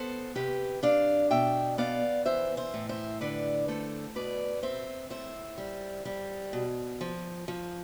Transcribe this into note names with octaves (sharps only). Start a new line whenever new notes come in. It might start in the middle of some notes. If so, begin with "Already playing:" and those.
Already playing: B3 A4 C5
C3 G4 B4
D4 D5 F5
B2 E5 G5
B3 D5 F5
E3 C5 E5
C5 E5
A2
C5 E5
D3 B4 D5
A3 A4 C5
B2 B4 D5
C4 C5 E5
A2 C5 E5
G3
G3
B2
F3
F3